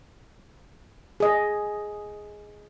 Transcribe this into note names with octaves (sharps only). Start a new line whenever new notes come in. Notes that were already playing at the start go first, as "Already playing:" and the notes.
G#4 D#5